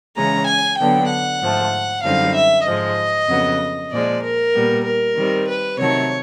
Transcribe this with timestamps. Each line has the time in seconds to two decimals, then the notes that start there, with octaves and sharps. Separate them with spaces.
0.16 C#3 E3 G#3 C#4 A#5
0.46 G#5
0.78 D3 F#3 B3 D4 G5
1.09 F#5
1.40 G#2 F3 A3
2.03 F#2 D3 G3 C4 D#4 F5
2.35 E5
2.65 G#2 F3 G#3 D#5
3.28 F2 C#3 F#3 B3
3.91 A#2 F3 G#3 D5
4.22 A#4
4.53 A#2 G3 B3
4.84 A#4
5.16 D#3 G3 C4
5.47 B4
5.78 C3 D#3 F#3 A3 C#5